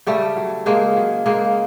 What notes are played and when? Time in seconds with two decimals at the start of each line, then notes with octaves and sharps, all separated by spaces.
0.06 C#3 G3 A3
0.36 F#3
0.66 C#3 G#3 A#3
0.96 F#3
1.26 C#3 G#3 A#3